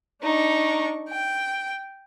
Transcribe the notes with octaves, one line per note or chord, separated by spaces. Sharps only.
D4 D#4 C#6
G5